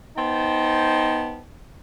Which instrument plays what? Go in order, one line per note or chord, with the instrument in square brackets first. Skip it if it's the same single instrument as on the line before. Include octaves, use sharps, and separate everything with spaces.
[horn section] B3 D#4 C5 G5 A5